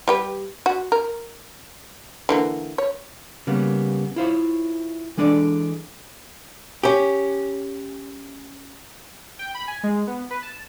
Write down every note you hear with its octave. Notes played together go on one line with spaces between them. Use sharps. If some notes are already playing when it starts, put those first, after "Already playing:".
G3 G4 B4
F#4
A#4
D3 E3 A#3
C#5
C#3 G3 A#3 B3
E4 F4 C5 C#5
E3 G#3 D4 A4 D5
C#4 G4
G5
B5
G#5
G#3
B3
B4
A5